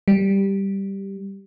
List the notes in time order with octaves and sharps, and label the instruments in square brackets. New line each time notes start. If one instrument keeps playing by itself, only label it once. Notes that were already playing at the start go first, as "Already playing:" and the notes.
[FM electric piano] G3